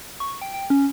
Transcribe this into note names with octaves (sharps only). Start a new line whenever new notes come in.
C#6
G5
G5
C#4